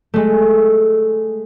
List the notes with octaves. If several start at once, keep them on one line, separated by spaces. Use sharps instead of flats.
G#3 A3